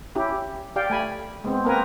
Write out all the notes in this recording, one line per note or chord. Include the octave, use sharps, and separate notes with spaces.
C#4 E4 G4
G4 D5 F5 G5
A3 G#5 B5
G#3 B3 C4
A#3 C4 A#4 B4 G#5 A#5